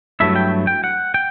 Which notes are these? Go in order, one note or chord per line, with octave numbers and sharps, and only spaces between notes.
G2 F#3 A3 E4 E5
G5
G5
F#5
G5